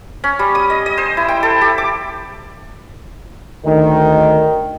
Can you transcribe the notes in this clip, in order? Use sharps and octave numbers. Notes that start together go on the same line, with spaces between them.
C#4
G3
D#6
D#5
D#5
C5
E4
G5
A4
G4
D6
D2 D#3